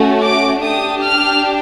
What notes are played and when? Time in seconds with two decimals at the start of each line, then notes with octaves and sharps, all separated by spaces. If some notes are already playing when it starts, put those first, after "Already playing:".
Already playing: A3 C#4 F#4
0.25 D6
0.65 D4 G4 D#6
1.04 F6